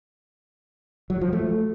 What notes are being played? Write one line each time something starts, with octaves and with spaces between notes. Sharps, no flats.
F#3
F3
A3